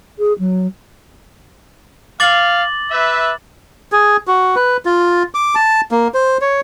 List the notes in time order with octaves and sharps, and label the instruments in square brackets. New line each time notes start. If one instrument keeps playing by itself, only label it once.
[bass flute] G#4
F#3
[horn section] F5 [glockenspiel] D6 A6 F#7
[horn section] B4 E5
[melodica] G#4
F#4
B4
F4
D6
A5
A#3
C5
C#5